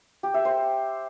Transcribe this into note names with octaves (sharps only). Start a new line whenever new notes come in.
G4
E5
C5